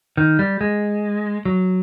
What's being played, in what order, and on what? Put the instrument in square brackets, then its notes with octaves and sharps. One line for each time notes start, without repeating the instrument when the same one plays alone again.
[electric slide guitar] D#3
G3
G#3
F#3